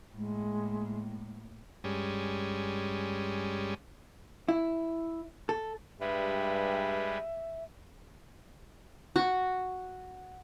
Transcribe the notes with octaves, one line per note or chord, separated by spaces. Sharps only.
A2 G#3 A#3
G2 G3 G#3 C#4
E4
A4
G2 G3 G#3 B4 E5
F#4